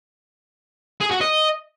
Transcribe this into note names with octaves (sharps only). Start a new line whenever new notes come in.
G#4
F#4
D#5